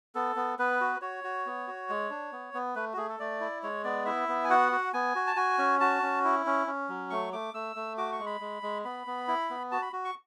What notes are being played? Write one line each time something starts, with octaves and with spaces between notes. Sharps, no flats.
B3 A4
B3
B3 B4
F#4
F#4 C#5
F#4
B3
F#4
G#3
D4
B3
B3
A3 B4
F#4
A3 G#4
A4
A3 D5
E4
G#3 C#5
B3 D5
E4 E5
B3
G#5
F#4 F#5
F#4
B3 G#5
F#4
A5
F#4 G#5
C#4
F#4 A5
C#4
E4
C#4
C#4
F#3
A3 C#6
A3 D6
A3 E6
A3
F#4 D6
C#6
G#3
B5
G#3
G#3
B3 B5
B3
E4
B3
F#4 A5
B5
F#4
C#6